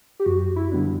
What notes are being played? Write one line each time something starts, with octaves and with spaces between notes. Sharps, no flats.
G4
F#2 F#4
E4
D3 G3 B3 D4